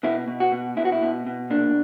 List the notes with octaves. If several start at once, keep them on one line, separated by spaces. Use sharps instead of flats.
B2 E4
B2
F#4
B2
B2 E4
F#4
E4
B2
B2
A#2 D4